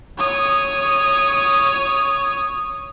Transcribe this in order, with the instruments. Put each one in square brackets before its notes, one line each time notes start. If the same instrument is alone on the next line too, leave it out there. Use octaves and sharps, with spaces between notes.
[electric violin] C#5 D#6